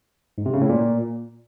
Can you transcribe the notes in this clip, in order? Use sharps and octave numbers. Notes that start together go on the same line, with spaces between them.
G#2
C3
C#3
A2
A#2